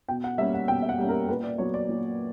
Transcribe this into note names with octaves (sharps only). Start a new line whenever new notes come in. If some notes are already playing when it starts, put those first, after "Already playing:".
B2 G5
F#5
G3 A#3 C#4 E5
F#5
B2 G5
E5
F#5
G3 A#3 C#4
A#4
A#2 B4
D5
F#3 B3 C#5
D5
A#2